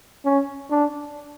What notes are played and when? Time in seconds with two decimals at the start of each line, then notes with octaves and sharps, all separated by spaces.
0.25 C#4
0.71 D4